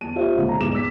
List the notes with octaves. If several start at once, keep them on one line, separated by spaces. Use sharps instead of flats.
E2 A5 D#7
F4 G4 C5 E5 F5
D#1 C#2 A#2
B1 A#5
E2 G#2 D#4 D6 E7
E6 B6